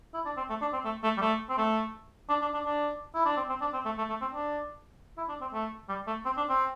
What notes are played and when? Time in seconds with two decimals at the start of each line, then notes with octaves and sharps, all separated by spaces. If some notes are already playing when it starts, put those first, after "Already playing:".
0.14 E4
0.25 D4
0.37 C4
0.49 A3
0.61 D4
0.73 C4
0.85 A3
1.03 A3
1.17 G3
1.21 A3
1.49 C4
1.58 A3
2.29 D4
2.42 D4
2.53 D4
2.65 D4
3.15 E4
3.25 D4
3.37 C4
3.49 C4
3.61 D4
3.74 C4
3.85 A3
3.98 A3
4.09 A3
4.21 C4
4.33 D4
5.18 E4
5.29 D4
5.41 C4
5.53 A3
5.89 G3
6.07 A3
6.25 C4
6.37 D4
6.49 C4